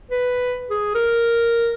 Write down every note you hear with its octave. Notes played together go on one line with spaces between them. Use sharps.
B4
G#4
A#4